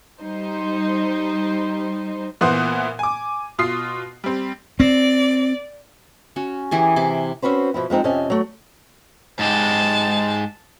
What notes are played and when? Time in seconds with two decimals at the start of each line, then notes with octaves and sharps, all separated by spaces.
0.20 G3 D#4 C5
2.41 A#2 E3 B3 C5 F#5 D#6
2.99 G#5 D6
3.59 B2 F4 D#6 C7
4.24 G3 C4
4.80 C4 D5
6.36 C#4 F#4
6.71 E3 G4 G#4
6.96 C3 E4 D6
7.42 C4 C#4 F#4 B4 C5
7.74 B2 F3 E4
7.90 F3 G#3 C4 D#4
8.04 F2 C3 C#4 D#5 G#5 A5
8.30 F#3 A3
9.39 G#2 G#3 G4 A5